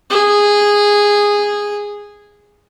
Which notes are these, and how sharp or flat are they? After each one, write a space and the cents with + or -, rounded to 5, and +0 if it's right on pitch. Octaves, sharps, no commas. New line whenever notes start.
G#4 -10